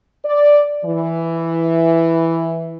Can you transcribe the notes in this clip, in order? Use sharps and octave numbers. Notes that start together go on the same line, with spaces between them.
D5
E3